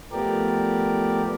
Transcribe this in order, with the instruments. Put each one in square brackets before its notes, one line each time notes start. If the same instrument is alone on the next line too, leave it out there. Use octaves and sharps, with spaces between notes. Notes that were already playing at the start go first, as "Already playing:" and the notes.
[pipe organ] F3 A3 B3 G4 A#4 D5